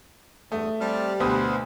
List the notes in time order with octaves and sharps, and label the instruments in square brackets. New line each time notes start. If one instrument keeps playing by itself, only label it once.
[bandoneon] E2 G2 D#6 [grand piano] A3
[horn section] G3 [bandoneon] C4 A5 F6
[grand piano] D2 B2 D#6 [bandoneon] B4 C5 F#5